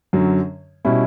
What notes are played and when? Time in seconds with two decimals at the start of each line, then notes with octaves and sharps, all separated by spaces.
0.13 F#2 D3 F#3
0.85 B2 G3 C#4 E4